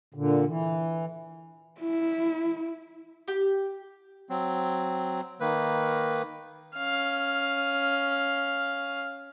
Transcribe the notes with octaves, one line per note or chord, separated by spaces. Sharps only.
A#2 D3
E3
E4
G4
F#3 C4
D#3 A#3 B4
C#4 F5